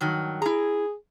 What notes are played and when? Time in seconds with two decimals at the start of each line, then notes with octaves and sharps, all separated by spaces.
0.01 G2 D#3 F#3
0.42 E4 G#4 A#5